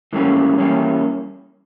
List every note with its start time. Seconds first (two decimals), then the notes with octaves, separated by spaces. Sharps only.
0.13 G#2 E3 G3 A#3 C#4
0.58 E3 G3 A#3 C#4